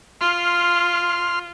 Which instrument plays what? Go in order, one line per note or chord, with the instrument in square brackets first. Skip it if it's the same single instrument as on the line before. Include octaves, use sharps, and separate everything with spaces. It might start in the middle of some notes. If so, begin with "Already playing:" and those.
[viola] F4 [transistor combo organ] C6 F6